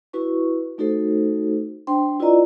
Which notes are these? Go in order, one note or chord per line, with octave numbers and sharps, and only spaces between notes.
E4 F#4 B4 C#6
A3 D#4 F#4 A4 C5
D4 C5 G5 C6
E4 F4 B4 D5 D#5 A#5